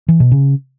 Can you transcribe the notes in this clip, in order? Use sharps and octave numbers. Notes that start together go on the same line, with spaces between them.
E3
B2
C#3